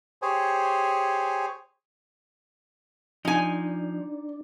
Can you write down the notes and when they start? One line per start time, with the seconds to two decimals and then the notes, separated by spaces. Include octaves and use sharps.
0.22 G4 G#4 C5 C#5 G#5
3.25 F3 D4 D#4 G#5